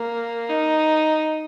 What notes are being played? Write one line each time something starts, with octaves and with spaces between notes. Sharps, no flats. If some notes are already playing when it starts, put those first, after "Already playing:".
Already playing: A#3
D#4